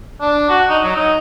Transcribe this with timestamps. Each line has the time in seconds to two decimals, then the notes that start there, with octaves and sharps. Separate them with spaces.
0.21 D4
0.49 F#4
0.69 D#4
0.84 F#3
0.96 D#4